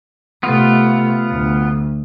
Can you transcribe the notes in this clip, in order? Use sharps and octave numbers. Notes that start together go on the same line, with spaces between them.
C3 A3 B3 F4
D2